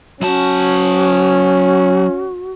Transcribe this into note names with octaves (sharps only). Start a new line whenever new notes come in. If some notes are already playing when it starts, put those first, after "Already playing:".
F#3 C#4 F#4 A5